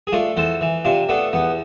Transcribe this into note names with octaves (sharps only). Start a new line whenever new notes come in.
G#4
A3 D4 F4
E2 A4 C5
E3
C3 D4 F4
A3 B3 D4
E2 B3